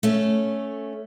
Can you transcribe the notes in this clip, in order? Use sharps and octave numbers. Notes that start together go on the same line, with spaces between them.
A3 C#4